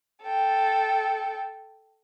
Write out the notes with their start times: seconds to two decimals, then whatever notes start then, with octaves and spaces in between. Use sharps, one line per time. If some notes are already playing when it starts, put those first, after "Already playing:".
0.22 A4 G5